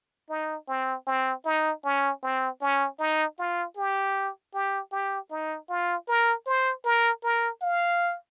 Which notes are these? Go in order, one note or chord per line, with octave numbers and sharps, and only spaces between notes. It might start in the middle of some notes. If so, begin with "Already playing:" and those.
D#4
C4
C4
D#4
C#4
C4
C#4
D#4
F4
G4
G4
G4
D#4
F4
A#4
C5
A#4
A#4
F5